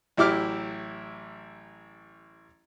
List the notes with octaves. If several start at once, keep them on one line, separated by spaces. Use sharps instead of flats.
A1 F#3 E4 G4 D6 F6